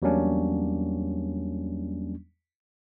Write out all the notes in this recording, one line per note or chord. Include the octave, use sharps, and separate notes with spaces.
E2 F#3 G3 A#3 C#4 D4